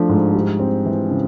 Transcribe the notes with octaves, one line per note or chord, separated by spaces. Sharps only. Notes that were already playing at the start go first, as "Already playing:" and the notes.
Already playing: F3 A3 D4
G#2
G3
C4
E3
C#3